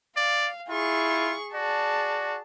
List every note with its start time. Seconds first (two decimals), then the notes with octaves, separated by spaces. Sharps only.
0.17 D5 F5
0.70 E4 F4 G#4 C#6
1.54 F#4 G#4 D5 A5